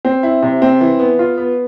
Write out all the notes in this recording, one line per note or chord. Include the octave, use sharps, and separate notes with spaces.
C4
E4
C3
C4
E3
B3
F4
B3